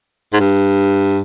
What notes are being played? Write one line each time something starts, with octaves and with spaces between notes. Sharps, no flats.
G#2
G2